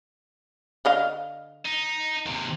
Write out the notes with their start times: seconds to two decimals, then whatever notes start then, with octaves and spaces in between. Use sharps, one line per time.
0.85 D3 D#5 F5
1.66 D#4
2.26 D#2 C3